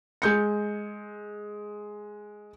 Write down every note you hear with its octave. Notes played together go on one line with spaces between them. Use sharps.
G#3 G6 C#7